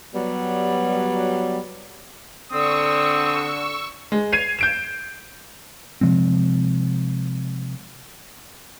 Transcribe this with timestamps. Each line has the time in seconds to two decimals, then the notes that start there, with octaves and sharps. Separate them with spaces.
0.14 F#3 G3 B3
2.52 D3 C4 C#6 D#6 E6
4.12 G#3
4.32 G#6 C7 D#7 F7
4.59 G6 D7 E7
6.01 C3 F3 G#3 C4